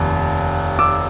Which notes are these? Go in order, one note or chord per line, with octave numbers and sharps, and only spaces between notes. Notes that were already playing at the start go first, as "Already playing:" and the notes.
Already playing: F1 D#2
D6 E6